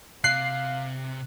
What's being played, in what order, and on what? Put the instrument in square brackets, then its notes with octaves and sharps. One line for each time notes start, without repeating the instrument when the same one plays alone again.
[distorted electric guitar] C3 [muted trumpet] F5 [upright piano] F#6 [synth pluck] C7